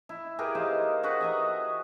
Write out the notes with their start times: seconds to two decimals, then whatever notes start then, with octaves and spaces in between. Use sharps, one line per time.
0.09 E4
0.39 G4 G#4 A#4 B4
0.55 D#4 C5 F5
1.03 F#4 G#4 B4 F#5
1.21 D#5 E5 A#5